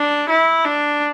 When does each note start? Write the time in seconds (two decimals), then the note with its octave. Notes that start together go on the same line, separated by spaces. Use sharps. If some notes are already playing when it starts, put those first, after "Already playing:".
Already playing: D4
0.29 E4
0.65 D4